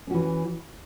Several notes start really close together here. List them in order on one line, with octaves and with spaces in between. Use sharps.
C#4 F#4 E3